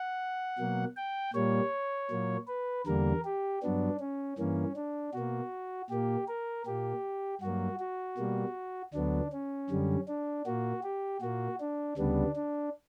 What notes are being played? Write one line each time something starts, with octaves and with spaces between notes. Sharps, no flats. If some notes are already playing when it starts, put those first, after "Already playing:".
Already playing: F#5
B2 F#3 A#3
G5
A#2 G3 A#3 C#5
A#2 F#3 A#3
B4
E2 D3 G3 A#3 A#4
G4
G2 F#3 B3 D4
C#4
G2 E3 A#3 C#4
D4
B2 A#3 F#4
A#2 A#3 G4
A#4
A#2 A#3 G4
G2 F#3 A#3 F#4
F#4
B2 G3 A#3
D2 D3 F#3 B3 D4
C#4
F#2 D3 G3
D4
A#2 A#3 F#4
G4
A#2 A#3 F#4
D4
D2 C#3 G3 B3 D4
D4